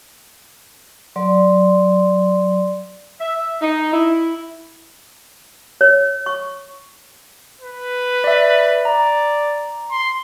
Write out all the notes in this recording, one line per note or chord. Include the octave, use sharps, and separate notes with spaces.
F#3 D5 C6
E5
D#4
E4
C#5
C#6
B4
D5 E5
D5 A#5
C6